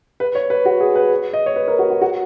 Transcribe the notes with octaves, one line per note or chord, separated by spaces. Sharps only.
B4
C#5
B4
F#4
G#4
B4
D#5
C#5
B4
A#4
F#4
F#4
F#4